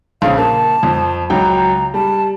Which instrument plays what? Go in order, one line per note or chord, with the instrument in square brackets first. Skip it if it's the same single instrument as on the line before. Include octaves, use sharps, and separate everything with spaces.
[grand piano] A#1 C#3 [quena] F5
[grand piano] A#3 [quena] A5
[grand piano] F2 F3
[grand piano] C#2 F#3 G5 [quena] A#5
[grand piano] G3 [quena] A5